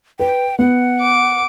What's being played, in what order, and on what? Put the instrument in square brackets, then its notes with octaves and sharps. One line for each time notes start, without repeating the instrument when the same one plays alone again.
[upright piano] B4 [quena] G5
[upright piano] B3 [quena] F#5
[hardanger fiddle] D6